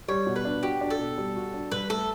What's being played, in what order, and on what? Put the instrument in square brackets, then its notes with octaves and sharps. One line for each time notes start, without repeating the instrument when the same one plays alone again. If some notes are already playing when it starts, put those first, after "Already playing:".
[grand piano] G3 [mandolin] C#5
[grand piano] B2
[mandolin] B4
[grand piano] D4
[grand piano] F#4 [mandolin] G4
[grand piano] D4
[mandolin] A4
[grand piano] B2
G3
F#4
D4
[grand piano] G2 [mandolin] B4
[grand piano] A3 [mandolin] A4